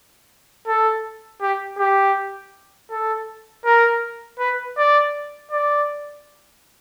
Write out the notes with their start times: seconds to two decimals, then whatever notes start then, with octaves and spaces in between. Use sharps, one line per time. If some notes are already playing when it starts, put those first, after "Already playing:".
0.67 A4
1.42 G4
1.79 G4
2.91 A4
3.65 A#4
4.39 B4
4.78 D5
5.52 D5